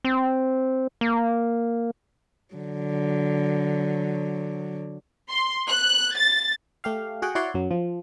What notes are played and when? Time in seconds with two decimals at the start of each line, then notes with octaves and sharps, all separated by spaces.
0.05 C4
1.01 A#3
2.55 D3 F#3
5.29 C6
5.68 F#6
6.14 A6
6.84 A3 G4 F5
7.22 F#4 G#4 F#5 G5
7.35 E4 F#4 C#5 D5 F#5 C6
7.54 F#2 F#3
7.71 F3